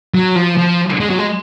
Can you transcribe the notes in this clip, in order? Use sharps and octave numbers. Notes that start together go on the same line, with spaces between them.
F#3
F3
F3
G#3
F#3
G#3